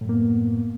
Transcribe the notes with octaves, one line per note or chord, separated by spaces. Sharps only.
F#2 A2 A#3 B3